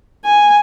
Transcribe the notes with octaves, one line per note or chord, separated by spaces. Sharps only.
G#5